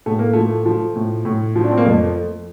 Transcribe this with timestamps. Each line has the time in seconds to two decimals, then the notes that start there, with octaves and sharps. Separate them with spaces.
0.06 A2 A3
0.19 A#3
0.33 F3 A3
0.66 F3
0.96 A2
1.25 A2
1.56 F3
1.64 D4
1.71 C4
1.78 A#3
1.85 F2 A3